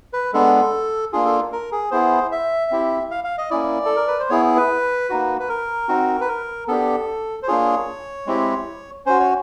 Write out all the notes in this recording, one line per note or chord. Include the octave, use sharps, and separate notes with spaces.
B4
G#3 B3 D4 A4
A#3 D4 F4 G#4
A4
A#4
G#4
B3 E4 G#4 C5
E5
C4 E4 G4
F5
F5
D#5
A#3 C#4 E4 D5
A4
A#4
B4
C5
B3 E4 G#4 C#5
B4
A#3 D#4 F#4
B4
A#4
C4 D#4 F#4
B4
A#4
B3 D4 G4 A4
C5
A#3 D4 F4 G#4 C#5
G#3 C4 E4 G4
C#4 F#4 C5
C#5